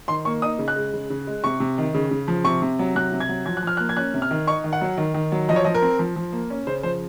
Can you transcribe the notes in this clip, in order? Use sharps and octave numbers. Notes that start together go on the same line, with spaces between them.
D#3 C6
A#3 C#6
D#4 D#6
C#3
F#6
G#3
C#3
C#3
G#3
C3 C#6
C3
D#3
C#3
C#3
F3
C3 C#6
C3
F#3
C3 F#6
C3
G#6
F#3
F3 G#6
F#6
F3 F6
A#3 F#6
G#6
C#4 F#6
C3
F6
D#3
D#4 C#6
D#3
F#5
F#3
D#3
D#3
F#3
F3 D#5
C#5
F3 D#5
A#4
C4
F3
F3
A#3
C#4
C#3 C5
F3 C5